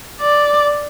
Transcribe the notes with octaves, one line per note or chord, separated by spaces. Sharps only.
D5